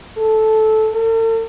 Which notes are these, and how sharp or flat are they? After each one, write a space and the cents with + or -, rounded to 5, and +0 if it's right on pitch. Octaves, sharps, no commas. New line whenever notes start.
A4 -10
A4 +45